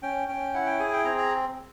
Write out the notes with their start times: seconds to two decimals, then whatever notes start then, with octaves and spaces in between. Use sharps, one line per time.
0.03 C#4 G5
0.28 C#4 G5
0.54 E4 F#5
0.66 G5
0.79 G#4 G#5
0.93 G5
1.05 C4 A#5
1.18 A#5